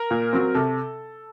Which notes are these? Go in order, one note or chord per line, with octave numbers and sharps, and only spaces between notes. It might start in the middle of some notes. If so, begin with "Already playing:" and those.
Already playing: A#4
A#2
F#3 C4
C3 A4